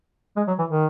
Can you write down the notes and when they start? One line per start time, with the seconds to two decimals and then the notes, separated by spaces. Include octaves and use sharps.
0.37 G#3
0.48 F#3
0.59 E3
0.70 D#3